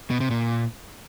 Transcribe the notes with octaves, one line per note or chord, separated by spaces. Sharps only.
B2
C3
A#2